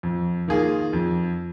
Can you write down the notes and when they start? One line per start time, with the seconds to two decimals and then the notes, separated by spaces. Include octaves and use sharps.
0.03 F2
0.48 D#3 A#3 F4 G#4
0.93 F2